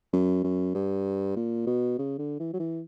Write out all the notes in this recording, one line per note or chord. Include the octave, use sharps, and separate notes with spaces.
F#2
F#2
G2
A#2
B2
C#3
D3
E3
F#3
E3